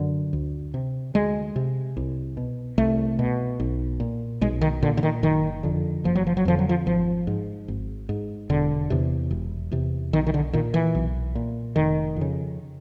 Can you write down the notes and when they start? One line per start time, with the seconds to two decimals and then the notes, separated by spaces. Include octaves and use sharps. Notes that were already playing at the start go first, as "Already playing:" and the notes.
Already playing: F#2 D3
0.33 D2
0.74 C3
1.14 D2 G#3
1.56 C3
1.97 C2
2.37 B2
2.78 C2 A3
3.19 B2
3.60 B1
4.00 A#2
4.41 B1 G#3
4.61 D#3
4.82 A#2 D3
4.97 D3
5.03 D#3
5.23 F#1 D#3
5.63 F2 D3
6.04 F#1 F3
6.15 F#3
6.27 F3
6.37 F#3
6.45 F2 D3 F3
6.59 F#3
6.69 F3
6.86 G#1 F3
7.27 G#2
7.68 G#1
8.09 G#2
8.49 E1 D3
8.90 E2 C3
9.31 E1
9.71 E2 C3
10.13 B1 D#3
10.27 D#3
10.34 D3
10.53 A#2 D#3
10.74 E3
10.95 B1
11.35 A#2
11.76 F1 D#3
12.16 F2 C#3